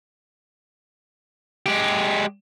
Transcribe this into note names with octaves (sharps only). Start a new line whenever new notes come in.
G#3 G4